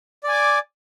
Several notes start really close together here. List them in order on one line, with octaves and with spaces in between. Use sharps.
D5 G#5 D6